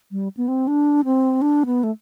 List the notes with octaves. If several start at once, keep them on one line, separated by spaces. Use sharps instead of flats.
G3
B3
C4
D4
C4
D4
B3
A3